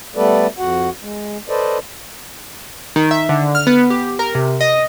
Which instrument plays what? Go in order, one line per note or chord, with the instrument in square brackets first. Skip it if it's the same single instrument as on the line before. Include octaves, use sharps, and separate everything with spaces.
[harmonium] G3 A3 B3 A4 B4 D5
F2 F#4 F#5
G#3
A4 B4 C5 D5 D#5
[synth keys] D#3
E5
D3
F6
B3
G4
A#4
C3
D#5